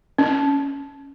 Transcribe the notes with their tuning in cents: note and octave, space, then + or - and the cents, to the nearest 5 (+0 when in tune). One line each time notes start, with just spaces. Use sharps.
C#4 +5